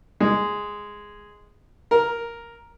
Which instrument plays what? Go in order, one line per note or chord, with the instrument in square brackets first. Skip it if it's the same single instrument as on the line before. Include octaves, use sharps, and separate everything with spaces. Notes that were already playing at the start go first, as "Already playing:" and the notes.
[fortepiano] G#3
A#4